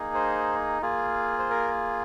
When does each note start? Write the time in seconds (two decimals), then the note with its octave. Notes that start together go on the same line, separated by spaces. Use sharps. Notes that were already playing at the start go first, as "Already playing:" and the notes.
Already playing: A#3 D#4 G#4
0.15 C5
0.82 A#3 F4 G#4
1.39 C5
1.50 A#4